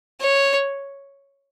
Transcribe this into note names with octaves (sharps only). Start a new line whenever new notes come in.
C#5